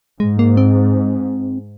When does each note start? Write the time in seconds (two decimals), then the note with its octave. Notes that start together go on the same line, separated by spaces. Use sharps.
0.20 G#2 G#3
0.39 A#3
0.57 C4